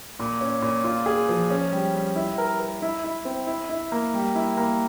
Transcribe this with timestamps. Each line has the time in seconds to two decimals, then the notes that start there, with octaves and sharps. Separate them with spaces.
0.19 A#2
0.41 C#4
0.62 A#2
0.84 F4
1.06 G#4
1.29 F3
1.50 C#4
1.72 G3
1.95 G3
2.15 E4
2.38 A#4
2.60 A#4
2.82 E4
3.04 E4
3.25 C4
3.47 E4
3.69 E4
3.92 A#3
4.14 G3
4.35 E4
4.57 A#3